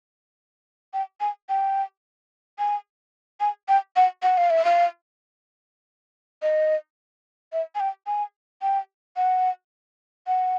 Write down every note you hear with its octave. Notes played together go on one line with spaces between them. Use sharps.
G5
G#5
G5
G#5
G#5
G5
F#5
F#5
F5
E5
F5
D#5
E5
G#5
G5
G#5
G5
F#5
F#5